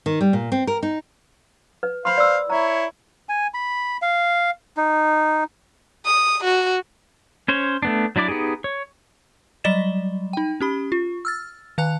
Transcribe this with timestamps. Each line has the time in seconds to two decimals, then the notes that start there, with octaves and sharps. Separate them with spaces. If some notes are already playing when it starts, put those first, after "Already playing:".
0.06 D#3
0.21 G3
0.33 A#2
0.52 C4
0.67 A#4
0.83 D#4
1.83 B4
2.05 C5 F5 B5 C6
2.18 D5 E6
2.50 E4 C#5 A#5
3.29 G#5
3.54 B5
4.02 F5
4.77 D#4
6.05 D#6
6.44 F#4
7.48 C#4 C5 C#5
7.83 A3 B3 D4
8.16 F#3 D4 E4 D5 D6
8.28 B3 D#4 G4 G#4
8.64 C#5
9.64 F#3 G3 D5 D#5 A6 E7
10.33 D#4 G5
10.61 C#4 G4 B5
10.92 F4
11.25 E6 F6 A6
11.78 D#3 F5 A5 F#6